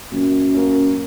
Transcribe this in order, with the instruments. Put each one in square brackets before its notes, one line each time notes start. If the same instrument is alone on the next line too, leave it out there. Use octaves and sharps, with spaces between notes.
[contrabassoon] F#2 [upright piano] A#2
[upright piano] A#3 C#4